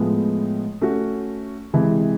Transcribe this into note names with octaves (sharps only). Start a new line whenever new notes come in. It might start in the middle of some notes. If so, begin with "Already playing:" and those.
Already playing: A2 F3 G#3 B3
A3 C#4 F#4
C3 E3 G#3